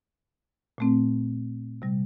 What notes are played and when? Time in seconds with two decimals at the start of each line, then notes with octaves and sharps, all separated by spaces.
0.78 A#2 A3 C4
1.82 C3 G3